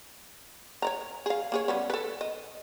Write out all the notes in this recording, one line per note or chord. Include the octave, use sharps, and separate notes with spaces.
C#5 D5 A#5
G#4 F5
A#3 G#4 C#5
G3 B3 C#4
A4 B4
D#5